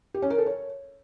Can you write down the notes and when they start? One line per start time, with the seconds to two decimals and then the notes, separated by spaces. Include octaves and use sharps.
0.14 G4
0.22 C#4
0.30 A#4
0.38 A4
0.46 C#5